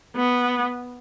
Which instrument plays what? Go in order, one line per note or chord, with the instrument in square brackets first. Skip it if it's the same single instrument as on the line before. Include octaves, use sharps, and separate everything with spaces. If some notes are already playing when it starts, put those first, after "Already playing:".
[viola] B3